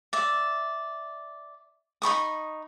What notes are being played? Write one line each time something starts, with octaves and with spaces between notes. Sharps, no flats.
D5 E5
D#4 B5 C#6 D#6